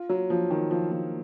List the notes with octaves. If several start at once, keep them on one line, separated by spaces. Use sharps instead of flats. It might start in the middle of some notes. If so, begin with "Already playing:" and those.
Already playing: F4
F#3
F3
D#3
F3
F3